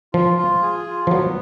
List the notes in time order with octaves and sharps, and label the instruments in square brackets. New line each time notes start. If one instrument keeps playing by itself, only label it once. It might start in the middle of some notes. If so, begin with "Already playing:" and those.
[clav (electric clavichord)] F3 [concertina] F4
[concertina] F4
G#4
F4
[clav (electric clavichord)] F3
[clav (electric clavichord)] F#3 [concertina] B3